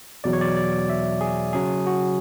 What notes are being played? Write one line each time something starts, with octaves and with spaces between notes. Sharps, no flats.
E2 B2 F#3 D5
C#5
D5
D5
E5
G#4
C#3 F#3 C#4 G#4
F#4